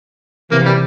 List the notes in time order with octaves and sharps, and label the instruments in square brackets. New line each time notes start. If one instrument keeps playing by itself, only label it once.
[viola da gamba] C3 E3 [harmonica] A#3
[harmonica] G3